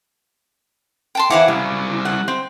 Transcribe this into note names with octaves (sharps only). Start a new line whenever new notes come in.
G5 A5 C6
E3 C4 E4 G#4 F5 F#5 D6
F#2 G3 E4
F#5
C4